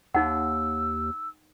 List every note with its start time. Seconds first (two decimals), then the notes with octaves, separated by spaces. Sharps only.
0.15 D#2 D#4 F#5 E6